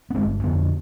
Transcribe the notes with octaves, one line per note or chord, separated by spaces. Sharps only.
B3
G1 G#3 C4
F2 D3 B3 D4